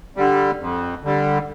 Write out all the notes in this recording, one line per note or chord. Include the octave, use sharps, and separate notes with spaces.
D3 G3
F2
D3 G3